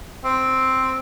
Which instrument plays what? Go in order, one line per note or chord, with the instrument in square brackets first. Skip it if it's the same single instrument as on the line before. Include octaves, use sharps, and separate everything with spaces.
[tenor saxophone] C4